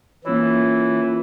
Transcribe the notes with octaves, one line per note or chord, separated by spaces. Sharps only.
E3 A#3 C#4 E4 F4 C#5